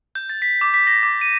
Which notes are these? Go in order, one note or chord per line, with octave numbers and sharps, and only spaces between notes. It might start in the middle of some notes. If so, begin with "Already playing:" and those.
G6
A6
B6
D6
B6
A#6
D6
D#7